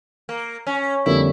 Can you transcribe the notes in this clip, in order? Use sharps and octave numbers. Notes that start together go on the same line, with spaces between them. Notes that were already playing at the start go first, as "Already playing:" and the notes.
A#3
C#4
F2 D3 G3 A#3 E4